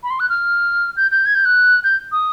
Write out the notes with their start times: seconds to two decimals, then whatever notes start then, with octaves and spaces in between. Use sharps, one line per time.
0.03 B5
0.10 C6
0.20 F#6
0.29 F6
0.97 G6
1.11 G6
1.26 G#6
1.35 G6
1.45 F#6
1.84 G6
2.12 D#6